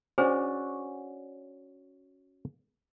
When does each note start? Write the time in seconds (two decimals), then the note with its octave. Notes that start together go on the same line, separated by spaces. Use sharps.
0.18 C#4 D4 F#4 G#4 C5 D5